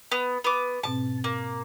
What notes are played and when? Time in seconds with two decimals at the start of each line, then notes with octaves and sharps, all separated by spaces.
0.11 B3
0.44 B3 D6
0.83 G#2 B2 C4 A5
1.24 A#3